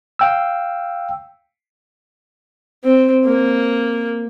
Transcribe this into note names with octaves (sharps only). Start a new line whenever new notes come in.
F5 G5 E6
C4
A#3